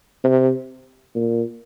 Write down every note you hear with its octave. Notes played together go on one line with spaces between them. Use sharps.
C3
A#2